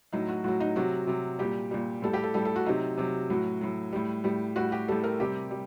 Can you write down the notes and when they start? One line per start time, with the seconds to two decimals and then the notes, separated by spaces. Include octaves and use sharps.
0.13 A2 F#3 D#4
0.28 F#4
0.44 A2 F#3 F#4
0.60 D#4
0.76 C3 F#3 F#4
1.07 C3 F#3
1.39 A#2 G3 G4
1.71 A#2 G3
2.02 A2 G3 A4
2.13 G4
2.23 A4
2.34 A2 G3 A4
2.45 A4
2.56 F#4
2.66 C3 F#3 D#4
2.97 C3 F#3
3.30 A2 F#3 F#4
3.61 A2 F#3
3.93 A2 G3
4.24 A2 G3
4.56 A2 G3 F#4
4.72 G4
4.88 A2 G3 A4
5.04 A#4
5.20 C3 G3 G4
5.51 G3